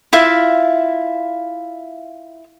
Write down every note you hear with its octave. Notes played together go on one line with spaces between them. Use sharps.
E4 F4 E5 F5